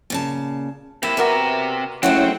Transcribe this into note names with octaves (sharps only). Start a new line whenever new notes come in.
A#2 C#3 A5
C3 A#3 E4 E5
B3 F#4 A#4 D5
F#3 G#3 A3 C4 C#4 E4 F#5 C#6